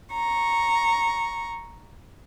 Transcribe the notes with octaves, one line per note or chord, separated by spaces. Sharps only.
A#5 C#6